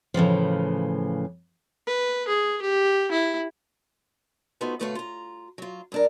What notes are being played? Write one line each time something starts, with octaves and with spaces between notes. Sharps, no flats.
A2 C#3 E3 F3
B4
G#4
G4
E4
F3 A3 B3 D#4 F4 F#4
D2 B2 A3 B4 C#5 F5
F4 A#5
F#3 F4
G2 D4 A#4